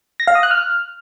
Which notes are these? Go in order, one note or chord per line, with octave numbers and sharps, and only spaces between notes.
A#6
F5
D#6
F#6
F6